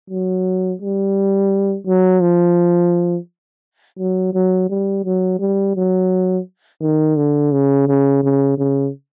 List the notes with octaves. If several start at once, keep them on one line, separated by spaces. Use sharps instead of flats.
F#3
G3
F#3
F3
F#3
F#3
G3
F#3
G3
F#3
D#3
D3
C#3
C#3
C#3
C#3